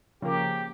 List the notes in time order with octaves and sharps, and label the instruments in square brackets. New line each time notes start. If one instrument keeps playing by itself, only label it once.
[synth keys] C#3 F3 A#3 [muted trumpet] G4